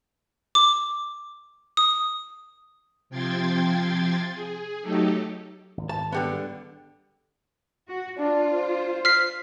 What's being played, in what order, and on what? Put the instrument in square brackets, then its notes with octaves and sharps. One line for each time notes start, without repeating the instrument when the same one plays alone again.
[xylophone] D6
D#6
[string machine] C3 F3 G5 C6 G#6 A6
G#4
F#3 A3 D#4 G4 A4
[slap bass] G#1
[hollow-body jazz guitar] A5
D3 G3 B3
[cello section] F#4
[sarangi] D4 [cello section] F4
[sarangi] C5
[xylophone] F6 B6 C7